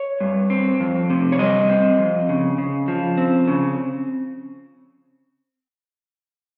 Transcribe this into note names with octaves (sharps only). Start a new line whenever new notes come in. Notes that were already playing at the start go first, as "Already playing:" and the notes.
Already playing: C#5
G2
C4
F2
C3
C#5
G3 D#5
C4
F2
C#3
C#3
F3
C4
C#3